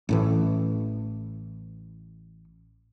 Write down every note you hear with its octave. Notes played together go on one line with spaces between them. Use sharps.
A1 A2 E3